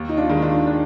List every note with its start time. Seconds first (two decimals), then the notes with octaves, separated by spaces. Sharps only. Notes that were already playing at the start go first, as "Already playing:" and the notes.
Already playing: D#2
0.09 D#4
0.17 D4 F4
0.29 D#3 G#3
0.42 D4 F4
0.67 D4